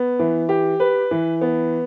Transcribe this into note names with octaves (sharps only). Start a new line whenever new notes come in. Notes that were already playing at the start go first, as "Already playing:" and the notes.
Already playing: B3
E3
G4
B4
E3
B3